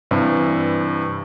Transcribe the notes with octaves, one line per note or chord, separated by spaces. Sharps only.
G2 C3 E3